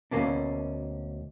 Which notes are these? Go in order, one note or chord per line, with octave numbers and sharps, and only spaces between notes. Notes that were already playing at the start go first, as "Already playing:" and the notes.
D2 B2 A#3 C#4 D4